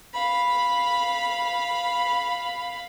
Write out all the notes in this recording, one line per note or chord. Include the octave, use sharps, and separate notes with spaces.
F5 B5